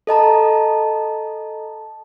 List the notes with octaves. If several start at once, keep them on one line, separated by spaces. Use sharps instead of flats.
A4 D#5 A5 A#5